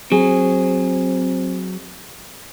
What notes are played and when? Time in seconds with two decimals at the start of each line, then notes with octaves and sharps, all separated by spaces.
0.12 F#3 C4 G#4